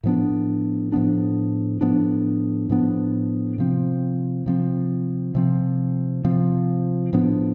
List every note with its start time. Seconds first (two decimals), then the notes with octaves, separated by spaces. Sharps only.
0.04 A2 F3 B3 D4
0.92 A2 F3 B3 D4
1.81 A2 F3 B3 D4
2.69 A2 F3 B3 D4
3.58 C3 F3 C4
4.46 C3 F3 C4
5.35 C3 F3 C4
6.24 C3 F3 C4
7.13 A2 F3 B3 D4